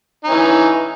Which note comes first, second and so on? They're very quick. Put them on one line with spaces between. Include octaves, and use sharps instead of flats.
D#4 C#4 E3